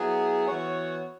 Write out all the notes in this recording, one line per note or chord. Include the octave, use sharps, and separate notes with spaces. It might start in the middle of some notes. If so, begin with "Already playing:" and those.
Already playing: F#3 B3 E4 G#4
E3 B3 F#4 C#5